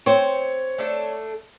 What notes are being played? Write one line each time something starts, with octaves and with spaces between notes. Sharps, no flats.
C4 C5 C#5
A3 D4 A4